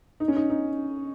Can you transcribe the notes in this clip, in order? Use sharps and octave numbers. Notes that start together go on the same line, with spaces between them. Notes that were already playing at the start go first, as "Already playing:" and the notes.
D#4
C#4
D#4
D#4